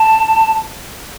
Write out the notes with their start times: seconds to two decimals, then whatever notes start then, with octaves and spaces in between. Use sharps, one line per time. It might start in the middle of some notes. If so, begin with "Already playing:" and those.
Already playing: A5